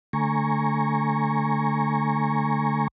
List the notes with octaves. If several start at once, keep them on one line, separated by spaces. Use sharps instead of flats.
D3 A3 G#5 A#5 C#6